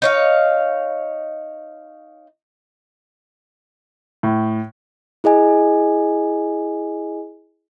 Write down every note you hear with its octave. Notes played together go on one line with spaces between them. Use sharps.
D#4 C#5 F5
A2
E4 G#4 D#5 G#5